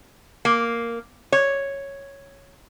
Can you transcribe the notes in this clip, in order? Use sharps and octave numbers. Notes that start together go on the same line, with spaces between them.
A#3
C#5